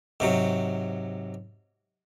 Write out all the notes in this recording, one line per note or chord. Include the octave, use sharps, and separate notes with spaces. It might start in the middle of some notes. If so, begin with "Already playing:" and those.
G#2 C3 F#3